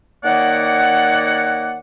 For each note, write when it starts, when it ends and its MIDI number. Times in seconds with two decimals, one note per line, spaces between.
0.25 1.78 51
0.25 1.78 58
0.25 1.78 73
0.25 1.78 74
0.25 1.78 78